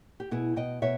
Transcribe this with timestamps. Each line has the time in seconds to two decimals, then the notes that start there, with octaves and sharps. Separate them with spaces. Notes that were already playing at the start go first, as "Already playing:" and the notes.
0.20 G4
0.31 B2 E4 G#4
0.56 B2 D#5 G5
0.82 B2 C#5 E5